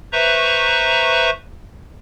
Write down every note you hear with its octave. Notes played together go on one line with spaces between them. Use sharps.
B4 C5 E5 A#5 C#6